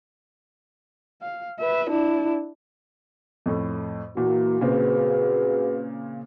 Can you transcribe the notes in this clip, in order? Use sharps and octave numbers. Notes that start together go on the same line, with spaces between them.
F5
B4 E5
D4 E4
F2 A2
A#2 E3 A#3 F#4
A#2 C#3 C4 F#4 G#4 B4